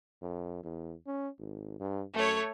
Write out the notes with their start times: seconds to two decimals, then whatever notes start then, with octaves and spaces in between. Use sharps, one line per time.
0.22 F2
0.64 E2
1.07 C#4
1.39 G#1
1.80 G2
2.15 F#2 A3 C#5